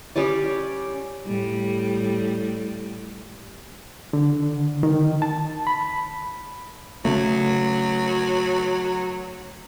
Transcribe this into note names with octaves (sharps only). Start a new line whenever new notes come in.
G3 C#4 G4 D5
A2 G3
D3
D#3
A5
B5
C#3 F#3 A3